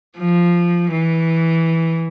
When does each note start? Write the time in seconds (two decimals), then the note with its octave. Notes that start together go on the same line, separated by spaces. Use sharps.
0.18 F3
0.91 E3